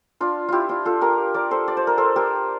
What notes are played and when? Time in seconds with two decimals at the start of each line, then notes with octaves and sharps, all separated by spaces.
0.20 D4 F4
0.48 E4 F4 G4
0.69 D4 F4
0.85 F4 A4
1.01 G4 A#4
1.34 A#4 D5
1.51 A4 C5
1.68 D5
1.77 C5
1.87 A#4
1.98 A4 C5
2.16 G4 A#4